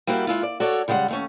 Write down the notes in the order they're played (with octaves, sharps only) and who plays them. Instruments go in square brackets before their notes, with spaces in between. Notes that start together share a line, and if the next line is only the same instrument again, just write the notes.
[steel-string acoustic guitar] G3 A#3 E4 F#4 G4
G#3 E4 F4
D5
F#4 A4 C#5 D5
C#3 G3 G#3 D5 F#5
D#2 A3 C#4